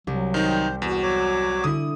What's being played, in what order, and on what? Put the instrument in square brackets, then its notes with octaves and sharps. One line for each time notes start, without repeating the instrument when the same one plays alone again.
[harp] C2 [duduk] F#3
[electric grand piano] D#3 D#4 [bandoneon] C5 [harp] G5 C6
[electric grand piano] E2 [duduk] F#4
[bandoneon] F#3 C#5 D6
[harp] D3 E4 [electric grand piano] D#6